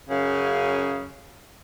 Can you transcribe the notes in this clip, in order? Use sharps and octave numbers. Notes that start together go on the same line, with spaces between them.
F#2 C#3 G#4 F5